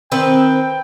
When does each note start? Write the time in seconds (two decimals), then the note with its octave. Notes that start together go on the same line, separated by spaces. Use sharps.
0.12 D#3 C4 B4 G5